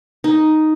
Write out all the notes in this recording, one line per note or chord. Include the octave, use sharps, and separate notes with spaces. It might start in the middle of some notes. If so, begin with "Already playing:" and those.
D#4